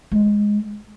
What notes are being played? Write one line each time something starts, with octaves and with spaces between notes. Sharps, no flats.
G#3